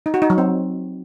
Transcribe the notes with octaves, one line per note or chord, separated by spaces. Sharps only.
D#4
F#4
D#4
F#3
C4